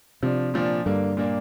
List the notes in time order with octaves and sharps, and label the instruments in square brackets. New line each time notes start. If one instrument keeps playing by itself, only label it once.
[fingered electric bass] C3 [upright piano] F3 D4
[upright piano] A#2 F3 D4
[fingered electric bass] G2 [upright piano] D3 A#3 D4
[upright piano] A#2 A#3 D4